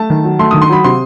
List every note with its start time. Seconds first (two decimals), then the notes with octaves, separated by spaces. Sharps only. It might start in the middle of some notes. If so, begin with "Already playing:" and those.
Already playing: A3 A5
0.10 D#3
0.24 F#3
0.39 A3 C6
0.51 D#3 D#6
0.62 C6
0.69 F#3 B5
0.84 C3 C6